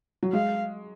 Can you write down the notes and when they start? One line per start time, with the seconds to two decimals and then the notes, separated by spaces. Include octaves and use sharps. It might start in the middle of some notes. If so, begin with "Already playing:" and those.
0.23 F#3
0.33 G#3 F5